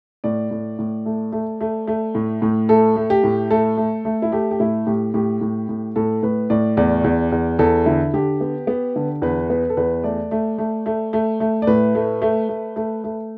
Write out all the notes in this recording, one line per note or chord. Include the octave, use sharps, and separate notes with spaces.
A2 D5
A2
A2
A3
A3
A3
A3
A2
A2
A3 A4
A3
G4
A2
A3 A4
A3
A3
E4
A3 G4
G4
A2 E4
A2 G4
A2 G4
A2
A2
A2 A4
A2 B4
A2 D5
E2 D5
E2
E2
E2 A4
D3 E4
D3 G4
B3
B3
D3
E2 B4
B3 B4
A4
E2 B4
A3 D5
A3
A3
A3
A3
A3
D5
A2 B4
A3
A3
A3
A3
A3